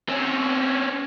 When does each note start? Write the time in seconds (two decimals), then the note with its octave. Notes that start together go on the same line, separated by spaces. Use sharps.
0.09 C4 C#4